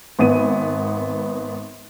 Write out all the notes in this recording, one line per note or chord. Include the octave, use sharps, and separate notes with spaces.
G#1 B3 D#7